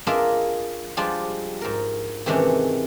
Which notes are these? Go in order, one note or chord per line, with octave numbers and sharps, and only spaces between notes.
D4 F4 G#4 A#4 D#5 E5
F3 G3 G#3 D4 F4
G#2 A#4
C3 D#3 E3 G#3 C#4 D4